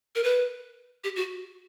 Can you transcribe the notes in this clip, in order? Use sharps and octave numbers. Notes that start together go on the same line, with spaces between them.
A#4
B4
G4
F#4